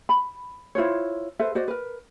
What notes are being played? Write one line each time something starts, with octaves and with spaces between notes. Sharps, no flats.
B5
E4 F4 C5 C#5
A4 B4 C5 E5
F#4 C5 D5 D#5
A#4 B4